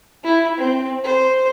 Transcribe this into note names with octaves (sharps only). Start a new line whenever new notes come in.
E4
C4
C5